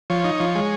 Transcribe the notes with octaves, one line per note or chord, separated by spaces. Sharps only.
F3 C#5
D#4
F3
G#3